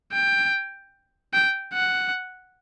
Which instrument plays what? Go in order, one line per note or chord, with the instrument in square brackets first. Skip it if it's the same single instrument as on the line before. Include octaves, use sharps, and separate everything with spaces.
[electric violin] G5
G5
F#5